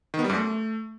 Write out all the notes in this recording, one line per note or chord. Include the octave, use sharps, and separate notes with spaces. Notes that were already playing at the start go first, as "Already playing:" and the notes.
D#3
B3
G3
F#2
A3